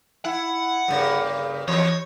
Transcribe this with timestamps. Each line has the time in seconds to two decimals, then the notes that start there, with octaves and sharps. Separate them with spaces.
0.25 E4 F#5
0.88 G2 C#3 A#3
1.68 E2 C#5